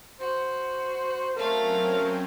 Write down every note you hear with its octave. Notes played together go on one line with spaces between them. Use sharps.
F#4 C5
F#3 A3 C4 C#4 A#4 F5